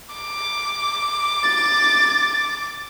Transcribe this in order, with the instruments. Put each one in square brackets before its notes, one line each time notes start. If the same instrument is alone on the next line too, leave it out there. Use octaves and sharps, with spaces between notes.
[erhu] D6
[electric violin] A6